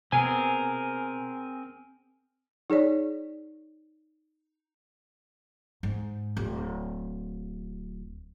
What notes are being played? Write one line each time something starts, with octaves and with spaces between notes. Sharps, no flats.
B2 C4 G#4 A#4 G#5
D#4 G#4 C#5 D5
G#2
D1